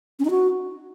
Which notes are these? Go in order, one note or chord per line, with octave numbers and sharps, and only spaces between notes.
C#4
D#4
F#4